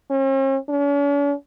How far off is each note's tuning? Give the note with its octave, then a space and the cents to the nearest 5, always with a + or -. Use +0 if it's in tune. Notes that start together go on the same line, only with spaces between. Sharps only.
C#4 -45
C#4 +45